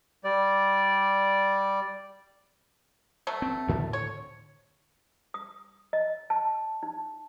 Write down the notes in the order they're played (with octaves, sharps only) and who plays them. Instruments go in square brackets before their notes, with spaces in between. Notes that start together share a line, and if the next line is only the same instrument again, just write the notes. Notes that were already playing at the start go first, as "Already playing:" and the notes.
[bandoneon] G3 D5
[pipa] B2 F#3 A3
[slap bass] C4
D2 A2 D3
[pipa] C#5
[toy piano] D#6
D#5
A5
D#4